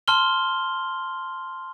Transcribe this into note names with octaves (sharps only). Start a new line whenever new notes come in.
A5 C6 F6 G7